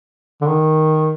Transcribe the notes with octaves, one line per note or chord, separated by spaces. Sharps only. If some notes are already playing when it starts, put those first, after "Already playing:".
D3
D#3